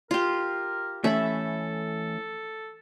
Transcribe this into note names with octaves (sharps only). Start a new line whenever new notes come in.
F4 G4 A#4
E3 A3 C#4 A4 E5 B5